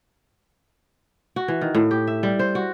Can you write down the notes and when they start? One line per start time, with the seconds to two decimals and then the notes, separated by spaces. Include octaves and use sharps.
1.36 F#4
1.48 E3
1.61 D#3
1.75 A2
1.91 G4
2.07 E5
2.23 G3
2.39 C5
2.55 F#4